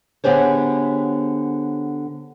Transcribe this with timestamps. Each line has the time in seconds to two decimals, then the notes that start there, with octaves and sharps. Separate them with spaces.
0.24 D3 B3 G4 G#4 C5 C#5